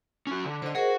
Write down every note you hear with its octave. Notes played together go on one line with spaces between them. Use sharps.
C#4 F#4
D3
D3 C5 D#5
F#4 G#4 A#4 C5 F#5